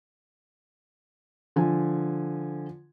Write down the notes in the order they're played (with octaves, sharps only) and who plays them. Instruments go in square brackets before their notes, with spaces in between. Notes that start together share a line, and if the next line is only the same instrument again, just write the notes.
[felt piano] D3 F3 G#5